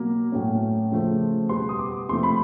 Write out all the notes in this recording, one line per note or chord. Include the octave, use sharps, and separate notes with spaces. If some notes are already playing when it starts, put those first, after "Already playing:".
Already playing: B2 F#3 A#3
A2 F#3 A3 C#4
C#3 F3 A3
B2 G3 B3 C6
D#6
D6
C3 F3 A3 C6
B5